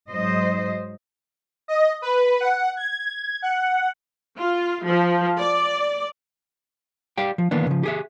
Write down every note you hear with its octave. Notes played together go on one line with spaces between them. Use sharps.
G#2 F#3 C5 D#5
D#5
B4
F#5
G#6
F#5
F4
F3
D5
G4 D5 F5 G5
F3
D#3 E3 A#3 B3 D4
C#3 F3
G4 G#4 E5